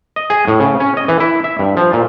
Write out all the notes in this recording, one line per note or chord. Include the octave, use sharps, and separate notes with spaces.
D#5
G#4
A2
C#3
C#4
D#5
E3
E4
E5
G2
F3
A#2